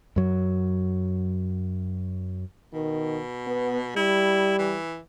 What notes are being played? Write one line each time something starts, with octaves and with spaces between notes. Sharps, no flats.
F#2 F#3
B2 D#3
B3
G3 E4
E3